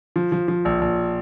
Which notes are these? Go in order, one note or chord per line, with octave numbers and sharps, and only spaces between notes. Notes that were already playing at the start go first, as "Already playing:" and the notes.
F3
F3
F3
A#1
A#1